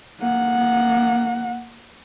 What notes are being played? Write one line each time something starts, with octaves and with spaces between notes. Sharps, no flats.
A#3 F#5